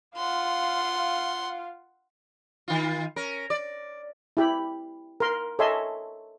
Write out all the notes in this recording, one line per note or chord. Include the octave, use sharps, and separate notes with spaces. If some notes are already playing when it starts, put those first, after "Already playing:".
F4 F5 F#5 C6
D#3 F4
C#4 A#4
D5
E4 G4 B5
A#4 C6
A4 C#5 D#5 E5 G#5 C6